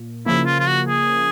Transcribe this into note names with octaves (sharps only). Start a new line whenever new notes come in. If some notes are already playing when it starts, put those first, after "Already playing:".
Already playing: A#2
C#3 F3 A#3 E4
F4
F4
F#4
G#4